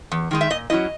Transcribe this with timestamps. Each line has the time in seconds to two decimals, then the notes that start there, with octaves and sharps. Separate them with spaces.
0.12 E2
0.31 D#3 G#3 D#4
0.41 E5
0.50 A#2 D#5
0.70 F#3 C#4 E4 D#5